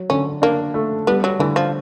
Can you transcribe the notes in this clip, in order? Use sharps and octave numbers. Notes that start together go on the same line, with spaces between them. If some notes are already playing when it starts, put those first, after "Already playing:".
Already playing: F#3
D3 C#4
A#3 D4
A3
G3 B3
F#3
D3 E3
F3